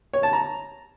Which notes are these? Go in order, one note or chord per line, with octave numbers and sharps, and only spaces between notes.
C#5
A5
A#5